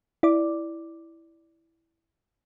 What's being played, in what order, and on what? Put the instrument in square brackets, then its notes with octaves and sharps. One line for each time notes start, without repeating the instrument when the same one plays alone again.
[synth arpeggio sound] E4 D5 D6